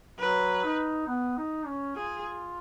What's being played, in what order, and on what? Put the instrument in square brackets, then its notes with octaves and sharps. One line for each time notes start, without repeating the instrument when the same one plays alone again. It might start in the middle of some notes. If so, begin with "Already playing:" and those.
[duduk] F#3 [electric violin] B4
[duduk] D#4
B3
D#4
C#4
[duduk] F4 [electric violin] G#4